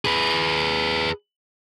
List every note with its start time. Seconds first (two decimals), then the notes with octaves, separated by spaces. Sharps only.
0.05 G#4 B4